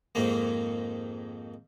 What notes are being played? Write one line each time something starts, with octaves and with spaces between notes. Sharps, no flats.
F2 G#2 D#3 A#3